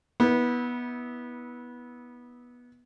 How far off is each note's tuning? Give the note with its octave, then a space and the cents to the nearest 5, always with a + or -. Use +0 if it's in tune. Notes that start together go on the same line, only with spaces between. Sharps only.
B3 -15 E4 -35